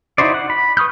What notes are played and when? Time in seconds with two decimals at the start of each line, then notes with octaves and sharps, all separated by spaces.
0.18 D#4 E4 F#4 C5 D5
0.34 F#5
0.50 B5
0.77 B4 C#6 D#6 F6 G6